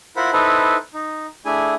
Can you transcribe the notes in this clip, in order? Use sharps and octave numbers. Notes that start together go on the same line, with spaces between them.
E4 F4 A#4 C5 F#5 B5
D#4 E4 A4 B4 C5
D#4
A3 D4 E4 G#4 G#5